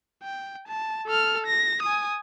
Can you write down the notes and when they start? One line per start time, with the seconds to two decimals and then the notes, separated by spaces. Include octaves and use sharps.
0.23 G5
0.68 A5
1.07 A4 F6
1.46 A#6
1.82 G#5 D#6